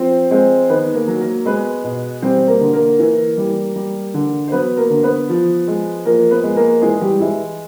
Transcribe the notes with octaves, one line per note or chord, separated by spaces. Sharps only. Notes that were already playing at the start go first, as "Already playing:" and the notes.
Already playing: F3 C4 C5
G#3 C4 C5
D#3 B3 B4
A#3 A#4
F#3
A#3 A#4
G#3 B3 B4
B2
G3 C4 C5
A#3 A#4
D3
A#3 A#4
E3
G3
G3
D3
C5
F#3 B3 B4
A#3 A#4
D3
B3 B4
F3
G#3
F3 A#3 A#4
B3 B4
G#3
A#3 A#4
E3 G#3 G#4
G3 G4
E3 G#3 E4